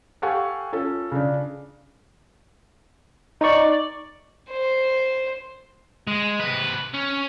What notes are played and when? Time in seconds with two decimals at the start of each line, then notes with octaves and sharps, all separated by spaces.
0.22 G4 A4 F5 F#5 G#5 C#6
0.73 C#4 F4 A4
1.11 C#3 D4
3.41 D#4 D5 C#6
4.51 C5
6.07 G#3
6.40 C3 B4
6.94 C#4